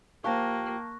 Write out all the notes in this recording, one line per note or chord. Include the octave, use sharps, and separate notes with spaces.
F3 A#3 G4 F5 A5 C#6 F#6 A#6